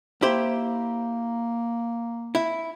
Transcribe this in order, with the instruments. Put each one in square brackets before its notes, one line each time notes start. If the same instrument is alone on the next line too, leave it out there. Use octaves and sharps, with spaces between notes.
[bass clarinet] A#3 [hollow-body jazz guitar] E4 G4 C5
[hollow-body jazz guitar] E4